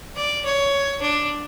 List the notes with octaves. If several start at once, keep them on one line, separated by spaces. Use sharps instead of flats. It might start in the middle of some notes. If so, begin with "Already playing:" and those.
D5
C#5
D4